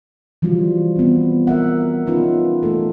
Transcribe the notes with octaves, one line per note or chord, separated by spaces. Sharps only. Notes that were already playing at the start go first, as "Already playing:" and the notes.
E3 F3 G3 F4 F#4
B3 C4
A#4 E5 F#5
B3 C#4 D#4 F4 B4
E3 A3 A#3 A4